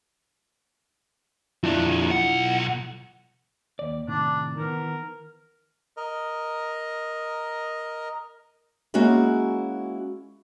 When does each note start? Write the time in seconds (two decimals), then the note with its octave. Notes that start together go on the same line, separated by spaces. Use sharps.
1.63 F2 D4 E4 F4
2.11 B1 F#5
3.79 D#2 D5
4.08 A2 C3 D#3 D4
4.57 D#3 E3 B3 A#4
5.97 A#4 D#5
8.94 G#3 A#3 C#4 E4 F#4